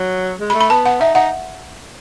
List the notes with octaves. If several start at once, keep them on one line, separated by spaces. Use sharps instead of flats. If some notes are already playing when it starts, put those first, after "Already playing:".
Already playing: F#3
G#3
B5
A3
B5
B3 A5
F#5
D#4 E5
D#4 F#5